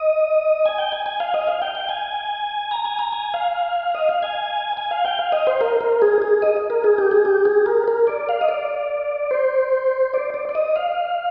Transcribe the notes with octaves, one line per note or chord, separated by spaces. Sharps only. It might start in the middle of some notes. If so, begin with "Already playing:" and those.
Already playing: D#5
G#5
G5
G#5
G#5
F5
D#5
F5
G5
G5
G#5
A#5
G#5
A#5
G#5
F5
D#5
F5
G#5
G#5
F5
G5
F5
D#5
C5
A#4
A#4
G#4
G#4
D#5
A#4
G#4
G4
G#4
G4
G#4
A#4
A#4
D5
F5
D#5
D5
C5
D5
D5
D5
D#5
F5